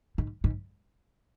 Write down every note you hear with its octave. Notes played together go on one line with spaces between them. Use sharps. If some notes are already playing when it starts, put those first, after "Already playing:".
G#2
G#2